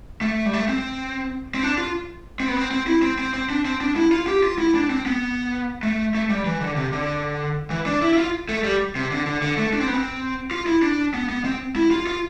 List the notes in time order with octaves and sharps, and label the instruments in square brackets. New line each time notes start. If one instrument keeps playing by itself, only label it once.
[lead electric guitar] A3
G3
A3
C4
C4
D4
F4
C4
B3
C4
C4
E4
C4
C4
C4
D4
C4
D4
E4
F4
G4
F4
E4
D4
C4
B3
A3
A3
G3
E3
D3
C3
D3
E3
D4
E4
E4
F4
A3
G3
C3
D3
D3
D3
A3
D4
C4
B3
C4
F4
E4
D4
B3
B3
C4
E4
F4
F4